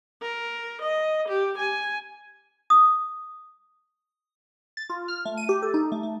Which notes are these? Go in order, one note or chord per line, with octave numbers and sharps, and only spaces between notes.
A#4
D#5
G4
G#5
D#6
A6
F4
F6
A3
D#7
G4
A4
D#4
A3
A3